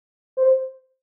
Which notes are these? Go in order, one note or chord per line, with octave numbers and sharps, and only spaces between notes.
C5